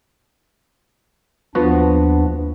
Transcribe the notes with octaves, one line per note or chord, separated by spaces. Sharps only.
D#2 F3 B3 D4 F#4